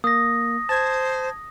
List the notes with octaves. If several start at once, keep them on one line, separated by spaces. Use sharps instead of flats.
A#3 D#6 A#6
C5 A5 G#6